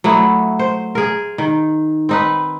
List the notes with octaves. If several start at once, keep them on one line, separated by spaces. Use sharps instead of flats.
F#3 A3 B3 E4
C5
G#4 A#4
D#3
C4 D#4 B4